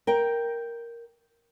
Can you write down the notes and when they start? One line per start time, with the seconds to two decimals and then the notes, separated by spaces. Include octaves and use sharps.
0.07 A#4 G5